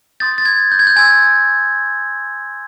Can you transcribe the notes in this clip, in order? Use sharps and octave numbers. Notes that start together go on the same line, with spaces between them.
C6 D#6 G6 A6
A6
G#6
G6
G#6
G6
G#5 C6 E6 G#6